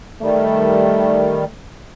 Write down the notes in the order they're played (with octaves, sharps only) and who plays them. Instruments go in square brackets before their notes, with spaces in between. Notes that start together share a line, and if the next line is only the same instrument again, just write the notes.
[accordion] D#3 G3 [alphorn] A3